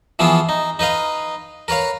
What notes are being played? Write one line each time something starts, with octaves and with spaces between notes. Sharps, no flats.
E3 F3 B3 E4 F4 G#4
D#4
D#4 B4 D#5 F5
A#4 B4 C#5 F5